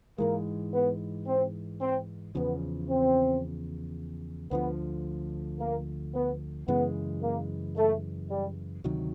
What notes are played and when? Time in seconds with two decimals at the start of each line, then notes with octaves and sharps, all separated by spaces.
0.18 G#2 E3 G#3 A#3
0.73 B3
1.27 C4
1.81 C4
2.35 E2 C#3 F3 B3
2.90 C4
4.51 D2 D3 F3 B3
5.60 A#3
6.14 B3
6.68 F#2 C#3 E3 G#3 B3
7.22 A#3
7.76 A3
8.30 G3
8.84 D2 C3 D#3 F#3